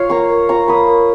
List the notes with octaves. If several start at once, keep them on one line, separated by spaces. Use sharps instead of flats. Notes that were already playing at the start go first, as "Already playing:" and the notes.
Already playing: F4 C#5 F5
A#3 A#5 C#6
A#3
F4 A#5 C#6
A#3 B5 D#6
A#3